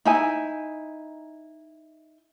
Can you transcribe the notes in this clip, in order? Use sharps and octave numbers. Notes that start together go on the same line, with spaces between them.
D#4 E4 G#5